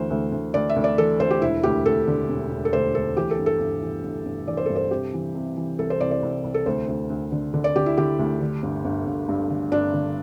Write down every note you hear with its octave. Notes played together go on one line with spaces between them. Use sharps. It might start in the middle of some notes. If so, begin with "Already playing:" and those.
Already playing: D2 E3 C5
D2
D2
D2 D5
E5
D2
D5
E3 A4
D2 C5
G4
E1 E4
D2 G4
D2 A4
D3
E1
E1
A4
D2 C5
D2 A4
E3 G4
A4
G1
A4
G1
E3
G1
G1
E3 D5
C5
G2 A4
C5
C3 G4
E3
C3
E3
C2 A4
C5
C2 D5
D5
C2
C2
A4
D2 C5
D2
D2
D3
D3
D5
D3 G4
E4
D3 G4
D2
D3
G1
G1
G1
G2
D3
G1 D4
D3